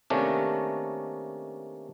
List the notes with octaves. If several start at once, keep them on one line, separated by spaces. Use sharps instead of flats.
C3 D#3 A3 A#3 C#4 D4